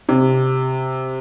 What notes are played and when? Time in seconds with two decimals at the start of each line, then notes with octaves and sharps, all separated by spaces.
0.09 C3